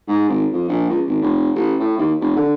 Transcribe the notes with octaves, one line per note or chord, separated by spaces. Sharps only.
G#2
G#1
F2
A#1
C#2
G#1
F1
A1
A2
D#2
F1
D3